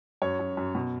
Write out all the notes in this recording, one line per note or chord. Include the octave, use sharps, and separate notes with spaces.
F#2 C#5
F#2
F#2
B2